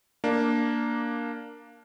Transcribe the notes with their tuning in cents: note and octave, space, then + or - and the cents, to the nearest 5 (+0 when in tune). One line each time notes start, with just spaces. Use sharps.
A#3 +0 D4 +0